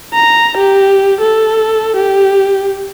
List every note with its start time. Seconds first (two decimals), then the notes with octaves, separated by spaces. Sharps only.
0.14 A#5
0.57 G4
1.21 A4
1.96 G4